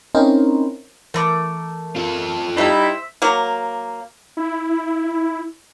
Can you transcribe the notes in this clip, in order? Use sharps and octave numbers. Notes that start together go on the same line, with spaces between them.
C4 C#4 D#4 E4 A#4 C5
E3 A3 A#4 A#5 D6
F4 A4
G3 D#4 E4 C5 E5 B6
F#3 A#3
E4